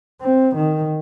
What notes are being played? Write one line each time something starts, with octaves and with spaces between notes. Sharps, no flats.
C4
D#3